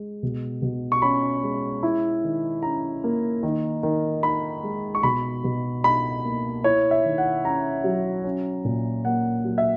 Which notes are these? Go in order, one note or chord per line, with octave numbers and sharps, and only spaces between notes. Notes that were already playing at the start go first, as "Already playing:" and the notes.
Already playing: G#3
B2
B2
C#6
C#4 B5
G#3
E4
D#3
C#4 A#5
A#3
D#3
D#3
D#4 B5
G#3
C#6
B2 B5
B2
D#4 B5
A#3
E4 C#5
E5
D#3
F#5
C#4 A#5
F#3
C#4
A#2
A#3 F#5
F#3
E5